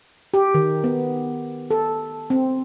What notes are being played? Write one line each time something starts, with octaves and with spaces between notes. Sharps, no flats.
G4
D#3
B3
A4
C4